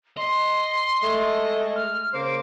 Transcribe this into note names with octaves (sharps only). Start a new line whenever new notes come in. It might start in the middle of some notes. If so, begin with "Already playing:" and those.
D#5 C6
G#3 A3
F6
C#3 A#3 C5 D6